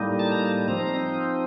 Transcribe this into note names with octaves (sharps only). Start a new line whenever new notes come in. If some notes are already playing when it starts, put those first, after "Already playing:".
Already playing: A2 G3 A#3 D#4
A5
A#5
A5
F3 C4 D#4 A#5